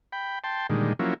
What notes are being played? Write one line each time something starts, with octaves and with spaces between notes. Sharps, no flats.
G5 B5
G5 A5 C6
A#2 D3 D#3 G3 G#3
F3 F#3 A#3 C#4 E4